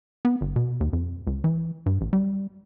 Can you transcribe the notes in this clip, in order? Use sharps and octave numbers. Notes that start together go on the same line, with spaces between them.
B3
G1
B2
D#2
F2
C#2
E3
G2
A1
G3